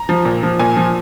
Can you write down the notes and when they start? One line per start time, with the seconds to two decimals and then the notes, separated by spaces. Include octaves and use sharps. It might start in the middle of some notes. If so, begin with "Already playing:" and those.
Already playing: A#5
0.09 F3
0.25 A#2
0.43 F3
0.59 A#2 G#5
0.77 F3